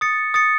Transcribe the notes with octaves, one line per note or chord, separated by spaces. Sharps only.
D#6 A6 C#7
D#6 A6 C#7